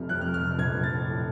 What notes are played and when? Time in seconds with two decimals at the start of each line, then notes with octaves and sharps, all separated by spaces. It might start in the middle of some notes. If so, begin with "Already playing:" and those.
Already playing: F1 C3 F3 F6
0.09 F2 F#6
0.21 F6
0.26 F3
0.34 F6
0.43 F1
0.59 A#1 G#6
0.75 A#1
0.83 A6
0.92 F3
1.08 A2